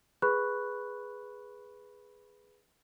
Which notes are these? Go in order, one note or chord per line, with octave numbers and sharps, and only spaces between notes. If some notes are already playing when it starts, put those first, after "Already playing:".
G#4 B4 B5 C#6 F#6